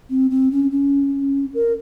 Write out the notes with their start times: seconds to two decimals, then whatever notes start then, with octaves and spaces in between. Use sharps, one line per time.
0.10 C4
0.31 C4
0.51 C#4
0.71 C#4
1.54 A#4